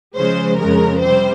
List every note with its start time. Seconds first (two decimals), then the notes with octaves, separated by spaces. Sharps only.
0.15 C#3 F3 G#3 C#4 C5
0.57 F2 C#3 G#3 C#4 A#4
1.00 C3 G3 C4 C5